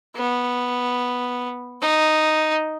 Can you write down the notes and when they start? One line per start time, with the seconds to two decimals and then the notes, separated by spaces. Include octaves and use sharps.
0.16 B3
1.81 D#4